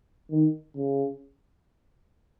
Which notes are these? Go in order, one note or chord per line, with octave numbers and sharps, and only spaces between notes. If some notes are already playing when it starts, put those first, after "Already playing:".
D#3
C#3